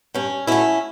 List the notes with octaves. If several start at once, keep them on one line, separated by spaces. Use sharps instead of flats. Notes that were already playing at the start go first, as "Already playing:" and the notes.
G2 C#4
F#3 A3 C#4 E4